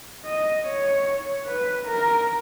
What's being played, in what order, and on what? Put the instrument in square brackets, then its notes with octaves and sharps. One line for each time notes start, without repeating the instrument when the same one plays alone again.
[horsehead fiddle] D#5
C#5
B4
A#4